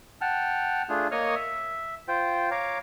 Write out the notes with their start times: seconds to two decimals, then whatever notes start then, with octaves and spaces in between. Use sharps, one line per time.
0.21 F#5 G5 A5 F6
0.89 A3 D4 F4 G#4
1.11 A#3 C#5 D#5 C#6 D#6 F6
1.35 E5
2.08 F4 C5 G5
2.51 C#5 F5 A#5 D6